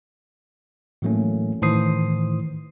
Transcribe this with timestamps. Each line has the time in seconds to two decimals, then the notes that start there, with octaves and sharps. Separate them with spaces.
1.02 A2 E3 F#3 A3 A#3 C#4
1.62 A2 D#3 E3 C5 D#6 C7